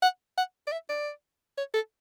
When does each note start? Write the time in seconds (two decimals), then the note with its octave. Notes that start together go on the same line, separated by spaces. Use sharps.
0.02 F#5
0.37 F#5
0.67 D5
0.72 E5
0.89 D5
1.57 C#5
1.74 A4